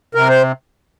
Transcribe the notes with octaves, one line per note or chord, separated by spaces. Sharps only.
C3 A#4
C5